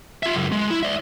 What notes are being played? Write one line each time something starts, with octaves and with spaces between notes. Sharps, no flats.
F4 E5
C#2 F#2
G#3
E4
D5 E5